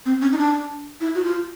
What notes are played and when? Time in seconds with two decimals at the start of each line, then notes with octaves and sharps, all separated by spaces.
0.06 C4
0.22 C#4
0.32 D#4
0.38 D4
1.01 E4
1.15 F#4
1.24 F4